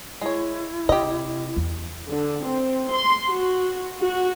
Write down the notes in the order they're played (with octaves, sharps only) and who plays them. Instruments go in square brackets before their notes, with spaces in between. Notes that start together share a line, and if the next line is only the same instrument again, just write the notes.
[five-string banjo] G#3 C#5 [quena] E4
[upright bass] C3 [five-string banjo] G4 D#5
[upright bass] E2
[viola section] D3
C4
C6
F#4
F#4